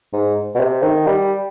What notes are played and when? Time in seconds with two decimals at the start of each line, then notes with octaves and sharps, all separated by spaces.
0.13 G#2
0.55 B2
0.60 C3
0.83 D#3
1.07 G3